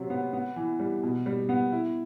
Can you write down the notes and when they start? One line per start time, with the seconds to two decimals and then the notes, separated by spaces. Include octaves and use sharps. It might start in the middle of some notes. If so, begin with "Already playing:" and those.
Already playing: C3 F#3 C4
0.10 B3
0.33 B3
0.56 E3
0.79 G3
1.03 B2
1.26 G3
1.49 B3
1.72 E4